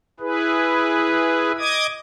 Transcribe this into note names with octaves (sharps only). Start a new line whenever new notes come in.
E4 G#4 B4
D#5 D6 D#6 G#6